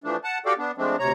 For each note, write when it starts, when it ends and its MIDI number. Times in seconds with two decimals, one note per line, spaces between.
0.04 0.17 52
0.04 0.17 53
0.04 0.17 57
0.04 0.17 62
0.24 0.38 78
0.24 0.38 81
0.46 0.53 66
0.46 0.53 67
0.46 0.53 69
0.46 0.53 74
0.46 0.53 77
0.46 0.53 79
0.58 0.72 59
0.58 0.72 62
0.78 0.96 53
0.78 0.96 56
0.78 0.96 57
0.78 0.96 60
0.78 0.96 62
0.99 1.12 38
0.99 1.12 48
0.99 1.12 73
0.99 1.12 82